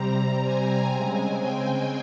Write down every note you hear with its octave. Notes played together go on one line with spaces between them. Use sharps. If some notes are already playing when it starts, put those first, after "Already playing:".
Already playing: C3 G3 C4 A#5
G#5
C#3 G#3 C4
G5